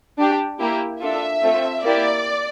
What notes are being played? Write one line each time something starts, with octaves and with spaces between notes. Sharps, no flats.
D4 G4
A#3 E4 G4
D4 F4 A4 E5
A3 C4 F4 A4
A#3 E4 G4 D5